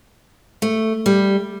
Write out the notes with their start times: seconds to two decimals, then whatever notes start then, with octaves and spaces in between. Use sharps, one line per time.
0.62 A3
1.06 G3